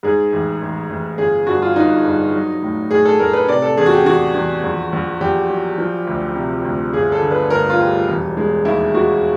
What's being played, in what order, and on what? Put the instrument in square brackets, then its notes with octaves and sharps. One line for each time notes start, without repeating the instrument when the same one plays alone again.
[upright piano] G#2 G#4
A1
A1
A1
G1 G#4
G2 F#4
F4
G1 D#4
G2
F#3
A2
A2 G#4
A4
A2 A#4
B4
C3 D5
A4
E2 G#4
F#4
G4
E2 F#4
E2
A#1
A#1
A#1 G4
F#3
F3
D2
C3
D2
G1 G#4
A4
D3
B4
G1 A#4
F4
G3
E1
G#3
D#2 E4
G#3 F#4